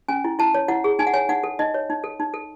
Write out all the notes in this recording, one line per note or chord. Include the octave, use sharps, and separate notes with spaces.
C#4 G#5
E4
E4 A5
C#5
E4 F#5
G#4
D#4 G#5
F#5
C#5 G#5
D#4 F#5
A4
D#4 D#5
C#5
D#4
A4
D#4
A4